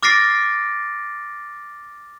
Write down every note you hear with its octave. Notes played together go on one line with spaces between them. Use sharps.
D6 F6 A6 A#6 C7 D7